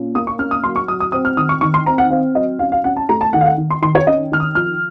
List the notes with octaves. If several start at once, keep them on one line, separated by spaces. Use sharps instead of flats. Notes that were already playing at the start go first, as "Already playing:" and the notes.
Already playing: A#2 C#4
A#3 D#6
C#6
C#4 F6
D#6
F#3 C6
C#6
F#3 D#6
D#6
C4 D#6
F6
D#3 D#6
C#6
D#3 C#6
C6
C4 A#5
F#5
C4 F5
F#3 D#5
C#4 F5
F5
C#4 F#5
A5
A3 A#5
A5
D#3 F#5
F5
F#5
D#3
C6
D#3 C6
C#5
C#4 D#5
D#3 F6
D#6
F3 F6